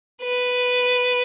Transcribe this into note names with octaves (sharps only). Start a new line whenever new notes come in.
B4